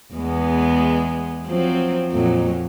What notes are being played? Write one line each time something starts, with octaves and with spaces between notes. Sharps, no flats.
E2 G#3 B3
F3 F#3 C4
F2 A#2 F#3